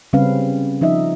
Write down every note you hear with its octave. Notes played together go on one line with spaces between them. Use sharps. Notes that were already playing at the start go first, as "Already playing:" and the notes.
C#3 G3 C4 C#4 B4 F5
F3 D#4 D#5 E5